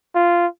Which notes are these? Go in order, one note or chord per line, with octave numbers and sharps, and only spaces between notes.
F4